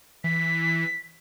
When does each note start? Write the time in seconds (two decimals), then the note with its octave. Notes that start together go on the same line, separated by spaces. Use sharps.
0.24 E3 B6